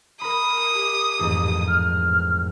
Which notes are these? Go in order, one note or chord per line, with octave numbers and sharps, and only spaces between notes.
A#4 B5 D#6
G4
A1 F2 G#2
F6